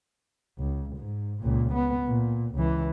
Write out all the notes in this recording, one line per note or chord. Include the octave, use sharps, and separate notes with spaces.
C#2
G#2
C#2 A#2
B3
A#2
C#2 E3